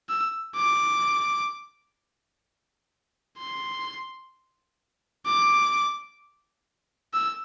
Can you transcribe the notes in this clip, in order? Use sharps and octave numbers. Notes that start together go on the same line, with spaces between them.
E6
D6
C6
D6
E6